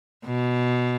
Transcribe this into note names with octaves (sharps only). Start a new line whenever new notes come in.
B2